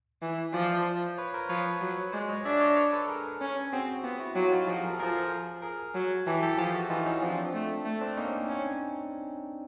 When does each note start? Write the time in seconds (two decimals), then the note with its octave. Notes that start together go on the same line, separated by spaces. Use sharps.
0.22 E3
0.54 F3 C5 D5
1.18 B4 C#5
1.34 A#4 C5
1.49 F3 B4 C#5
1.81 F#3
2.13 G#3 C5 D5
2.29 C#5 D#5
2.45 D4 D5 E5
2.60 C#5 D#5
2.76 B4 C#5
2.92 A4 B4
3.08 G#4 A#4
3.41 C#4
3.72 C4 F#4 G#4
4.03 B3 F4 G4
4.20 E4 F#4
4.35 F#3 F4 G4
4.52 D#4 F4
4.67 F3 F#4 G#4
4.83 G#4 A#4
4.93 A4
4.99 F3 G#4 A#4
5.62 G#4 A#4
5.95 F#3
6.27 E3 G4 A4
6.43 G4 A4
6.58 F3 G4 A4
6.74 F#4 G#4
6.90 E3 D#4 F4
7.06 C#4 D#4
7.22 F3 C4 D4
7.54 A3
7.85 A3
8.01 C4 D4
8.17 A#3 C#4 D#4
8.48 C#4